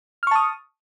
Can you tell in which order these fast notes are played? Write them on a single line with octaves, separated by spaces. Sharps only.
F6 C#6 A5 D#6